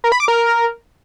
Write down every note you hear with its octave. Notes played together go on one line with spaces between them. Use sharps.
A#4
B5
D6
A#4